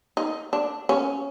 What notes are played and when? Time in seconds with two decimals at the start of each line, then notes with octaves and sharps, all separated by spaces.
0.17 D#4
0.53 D4
0.89 C#4